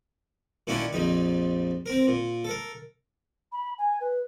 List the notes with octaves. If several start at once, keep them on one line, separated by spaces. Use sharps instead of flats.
A#2 D#3 C#4 D4 E4 F#4
A#1 F2 D#4
C4 A#4
A#2
A4 A#4
B5
G#5
B4